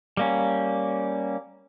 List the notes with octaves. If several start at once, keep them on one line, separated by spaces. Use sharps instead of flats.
G3 A#3 C#4